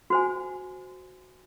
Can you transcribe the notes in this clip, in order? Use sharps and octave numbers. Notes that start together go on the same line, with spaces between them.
F#4 C5 G#5